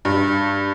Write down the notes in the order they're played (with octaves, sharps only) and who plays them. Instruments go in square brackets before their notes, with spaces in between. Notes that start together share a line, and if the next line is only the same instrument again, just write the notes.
[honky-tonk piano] G2